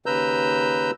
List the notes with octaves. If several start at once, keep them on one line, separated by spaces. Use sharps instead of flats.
D#2 C#3 B4 A#5 E6 G6